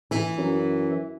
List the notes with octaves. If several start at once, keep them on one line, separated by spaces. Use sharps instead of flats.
E3
F#2